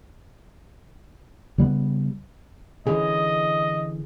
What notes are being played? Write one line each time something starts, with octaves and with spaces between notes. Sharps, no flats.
C#3 G3 B3
D3 E3 C#4 G#4 D#5